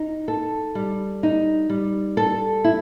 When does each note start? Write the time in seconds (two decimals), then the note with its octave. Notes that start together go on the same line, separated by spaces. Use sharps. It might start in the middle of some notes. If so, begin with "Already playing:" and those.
Already playing: D#4
0.28 A4
0.75 G3
1.23 D#4
1.70 G3
2.17 A4
2.64 E4